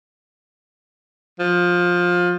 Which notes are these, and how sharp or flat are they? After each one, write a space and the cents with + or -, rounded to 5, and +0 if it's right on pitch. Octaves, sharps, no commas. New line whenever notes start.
F3 +20